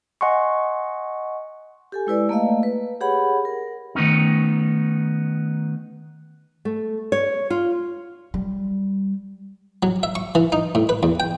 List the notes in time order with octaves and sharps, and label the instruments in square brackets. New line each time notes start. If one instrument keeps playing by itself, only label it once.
[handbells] D#5 F#5 G#5 C6 C#6
[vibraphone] G4 A4 G#5
G#3 E4 B4 D5
A3 A#3 D#5 F5
B4
G4 G#4 C#5 F#5 B5
A#4
[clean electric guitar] D#3 A3 B3 C#4 D#4
[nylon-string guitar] A3
C#5
F4
[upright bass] G3
[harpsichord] F#3
E5
C#6
E3
D#4
A2
B4
E2
G5